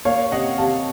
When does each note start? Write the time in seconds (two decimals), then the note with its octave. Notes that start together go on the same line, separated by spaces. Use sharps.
0.05 A#3 C#5 F5
0.32 C3 D#5 F#5
0.58 C3 F5 A5